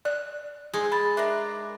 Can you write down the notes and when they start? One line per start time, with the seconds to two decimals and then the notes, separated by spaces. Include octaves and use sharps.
0.05 D5 F#6
0.74 G#3 C4 D#4 G#4
0.92 A5 B5
1.17 D4 A#4 E5 A#5